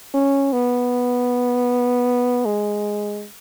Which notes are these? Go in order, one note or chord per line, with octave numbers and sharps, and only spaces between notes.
C#4
B3
G#3